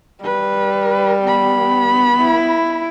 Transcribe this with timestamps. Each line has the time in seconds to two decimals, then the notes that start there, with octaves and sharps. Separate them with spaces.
0.25 G3 B4
1.23 B3 B5
2.21 E4